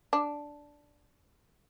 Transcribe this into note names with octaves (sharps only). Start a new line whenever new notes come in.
D4